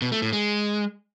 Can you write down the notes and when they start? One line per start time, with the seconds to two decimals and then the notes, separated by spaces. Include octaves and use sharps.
0.02 B2
0.12 A3
0.22 A2
0.33 G#3